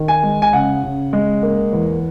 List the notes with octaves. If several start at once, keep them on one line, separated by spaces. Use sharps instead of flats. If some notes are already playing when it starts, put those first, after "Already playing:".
Already playing: D#3
G#5
G#3
G#5
C#3 F#5
C#3
G#3
A#3
E2